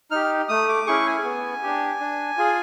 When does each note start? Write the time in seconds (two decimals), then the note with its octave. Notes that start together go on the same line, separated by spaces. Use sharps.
0.11 D#4 G4 F6
0.49 A3 D#6
0.68 D6
0.86 C#4 E4 G#4 C#6
1.06 G#5
1.24 B3
1.63 D4 G4
2.00 D4
2.37 F4 G#4